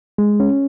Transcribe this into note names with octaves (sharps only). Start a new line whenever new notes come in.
G#3
C#4